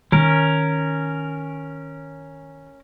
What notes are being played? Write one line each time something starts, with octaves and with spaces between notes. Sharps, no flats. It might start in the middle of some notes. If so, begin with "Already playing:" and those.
D#3 C#4 D#4 A#4